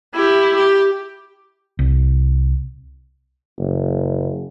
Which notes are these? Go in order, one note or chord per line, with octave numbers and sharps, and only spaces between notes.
E4 G4
G4
C2
F#1